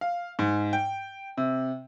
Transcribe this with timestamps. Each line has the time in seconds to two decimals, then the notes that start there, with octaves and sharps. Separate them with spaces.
0.01 F5
0.39 G#2
0.73 G5
1.37 C3